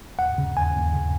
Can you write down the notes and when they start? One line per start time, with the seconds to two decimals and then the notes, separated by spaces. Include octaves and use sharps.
0.18 D#2 F#5
0.38 C#3
0.56 D#2 G#5
0.76 D#2
0.93 C#3